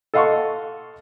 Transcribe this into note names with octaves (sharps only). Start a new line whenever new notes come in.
A4 D#5 F5 F#5 C6 C#6